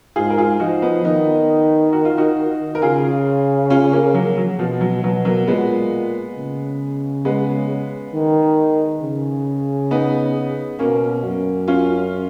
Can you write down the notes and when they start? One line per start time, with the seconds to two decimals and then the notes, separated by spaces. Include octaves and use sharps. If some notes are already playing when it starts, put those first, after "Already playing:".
0.16 G#2 F4 G#4
0.30 A#4
0.38 F4 G#4
0.60 F3 D#4 F#4
0.82 B3 D#4
1.04 D#3 B3 D#4
1.93 F#4
2.05 F4
2.17 D#4 F#4
2.75 A#4
2.81 C#3 F4 G#4
3.70 C#4 F4
3.92 A#3 C#4
4.14 F#3 A#3
4.38 F#3
4.59 B2 F3
4.81 F#3
5.03 B2 F#3
5.25 F#3 A#3
5.48 A#2 G#3 B3
6.36 C#3
7.25 G#3 B3
8.14 D#3
9.02 C#3
9.91 B3 D#4
10.79 B2 A#3 C#4
11.24 F#2
11.68 C#4 F4